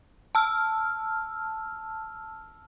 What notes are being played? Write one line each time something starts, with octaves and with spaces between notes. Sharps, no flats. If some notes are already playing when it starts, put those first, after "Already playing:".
A5 E6 F6